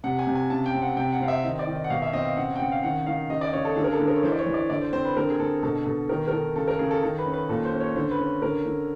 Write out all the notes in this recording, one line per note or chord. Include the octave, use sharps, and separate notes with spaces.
C3 F#5
G#5
C3
G#5
C#3 A5
G5
C4
F#5
C3 G5
F#5
C4 F5
E5
D#3 D#5
D5
D#3
D#5
F#5
B2 F5
E5
C4 D#5
F5
C#3 F#5
G5
C#3 F#5
F5
D#3 F#5
D#3 F5
C#3 D#5
D5
C#3 C#5
A4
D3 G#4
A#4
A4
D3
A#4
C#5
E3 C5
D5
C#5
E3
D5
D3 D5
C5
C4 C5
B4
D3 A#4
G#4
D3 A4
B2 A4
B2 A4
D#3 A#4
A#4
D#3 A4
C#3 A4
A#4
C#3 G#4
A4
D#3 A4
B4
C#4
B4
A#2 A4
C5
C#4
C#5
D3 C5
B4
C#4
D3 A#4
D3